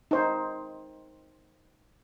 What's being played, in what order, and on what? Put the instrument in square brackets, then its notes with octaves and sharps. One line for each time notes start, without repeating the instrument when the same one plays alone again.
[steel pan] D#4 C5